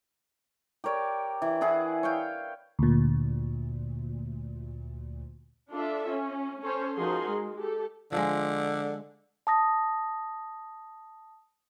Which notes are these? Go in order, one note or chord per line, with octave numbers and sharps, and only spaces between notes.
G4 A#4 C#5 D5
E3
E4 G#4 B4 F#5
C#5 F5 G5
D2 A#2
D4 F4 A4 E5
C#4
C#4 A4 C5 C#5
F3 D#4 F#4 G#4 A#4 C6
G#3
G4 A4
D3 F3 G#3
A5 D#6 A#6